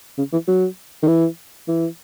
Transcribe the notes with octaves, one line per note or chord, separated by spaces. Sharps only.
C#3
E3
F#3
D#3
E3
E3